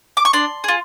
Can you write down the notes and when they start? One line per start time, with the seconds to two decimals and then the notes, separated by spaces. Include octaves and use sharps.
0.17 D6
0.25 C#6
0.33 D4 C6
0.64 F4 G#4